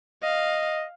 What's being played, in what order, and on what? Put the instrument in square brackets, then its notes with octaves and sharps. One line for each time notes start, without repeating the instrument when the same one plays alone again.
[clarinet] D#5 [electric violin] F5